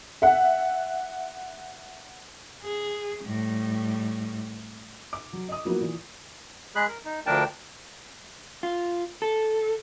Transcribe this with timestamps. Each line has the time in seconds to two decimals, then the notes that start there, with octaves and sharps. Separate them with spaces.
0.22 E5 F#5
2.63 G#4
3.25 A2 G3
5.13 D6
5.33 F#3
5.49 D#5 D#6
5.65 F3 F#3 A#3 B3 E4 F#4
5.80 A#2 E3
6.76 G#3 G#4 B5 F#6
6.88 A#4
7.05 D#4
7.26 D2 F3 D4 A#4 G5 A5
8.63 F4
9.22 A4